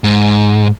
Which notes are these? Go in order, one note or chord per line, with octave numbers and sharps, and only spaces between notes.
G#2